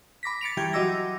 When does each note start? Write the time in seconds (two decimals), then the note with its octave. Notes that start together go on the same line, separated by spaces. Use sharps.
0.23 B5 D6 A#6 B6
0.41 A6 C#7 D7 F7
0.57 E3 G3 G4 G6 G#6
0.73 F#3 F#4 D#5 D6 E6 A#6